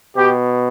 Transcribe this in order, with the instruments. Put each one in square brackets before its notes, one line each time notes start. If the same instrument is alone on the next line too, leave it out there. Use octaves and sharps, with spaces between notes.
[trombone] B2 [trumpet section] G4